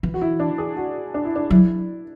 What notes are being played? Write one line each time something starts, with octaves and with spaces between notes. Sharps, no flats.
E3
F#4
E4
D4
G#4
F#4
D4
E4
D4
F#3 E4